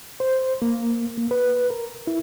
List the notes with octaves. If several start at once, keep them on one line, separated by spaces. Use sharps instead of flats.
C5
A#3
A#3
B4
A#4
E4